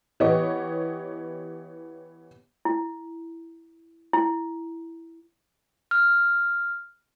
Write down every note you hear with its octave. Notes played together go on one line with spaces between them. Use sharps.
E3 B3 G4 C#5 D#5
E4
E4
F6